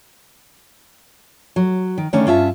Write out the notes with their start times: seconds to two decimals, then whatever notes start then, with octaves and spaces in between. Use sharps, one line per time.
1.56 F#3
1.98 D#3
2.13 D3 D#3 A3 C#4 D4
2.26 G2 C#4 F4 E5 A5